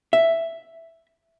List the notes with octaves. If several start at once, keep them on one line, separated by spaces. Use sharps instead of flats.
E5